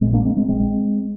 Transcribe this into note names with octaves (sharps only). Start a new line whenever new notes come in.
A#1 A#2 G#3 C4
A#3 D4
G#3 C4
G#3 C4
A#1 A#2 G#3 C4